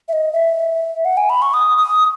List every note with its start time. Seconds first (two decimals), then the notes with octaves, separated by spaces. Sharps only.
0.08 E5
0.13 D#5
0.33 E5
1.05 F#5
1.17 G#5
1.29 B5
1.42 C#6
1.54 D#6
1.78 D#6